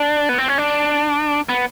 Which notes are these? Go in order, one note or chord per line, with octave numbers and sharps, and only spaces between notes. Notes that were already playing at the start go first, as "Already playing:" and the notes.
Already playing: D4
B3
C4
C#4
D4
B3